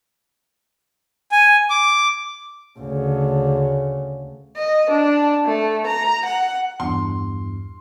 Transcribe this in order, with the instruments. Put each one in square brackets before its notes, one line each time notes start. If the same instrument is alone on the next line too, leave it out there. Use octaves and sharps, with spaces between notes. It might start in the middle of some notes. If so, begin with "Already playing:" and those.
[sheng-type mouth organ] G#5
D6
[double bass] D2 C#3
[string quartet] D#5
D4
A3
A#5
F#5
[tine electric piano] E2 G2 [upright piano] C6